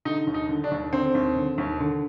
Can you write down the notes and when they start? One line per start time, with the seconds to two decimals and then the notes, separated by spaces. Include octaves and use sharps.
0.05 D3 D#4
0.27 D#2
0.34 D#4
0.49 D3
0.64 D4
0.71 D#2
0.92 D3 C4
1.15 D#2
1.36 D3
1.58 D#2
1.80 D3